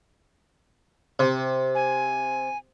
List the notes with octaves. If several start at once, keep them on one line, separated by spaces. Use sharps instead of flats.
C3
G#5